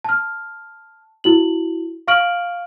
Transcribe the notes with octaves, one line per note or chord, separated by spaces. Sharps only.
A5 F6
E4 F#4 F#7
F5 C#6 F6 D7 F#7